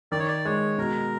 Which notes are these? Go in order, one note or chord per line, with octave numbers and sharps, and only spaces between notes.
D#3 D5
C#5
D5
G#3 C#5
B2 A#4